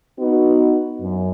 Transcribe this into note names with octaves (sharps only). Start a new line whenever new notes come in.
B3 D#4 F#4
F#2